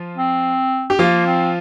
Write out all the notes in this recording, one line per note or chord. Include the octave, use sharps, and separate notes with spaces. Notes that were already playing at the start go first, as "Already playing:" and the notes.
Already playing: F3 F4
C4
G4
F3 A#3 F4
C4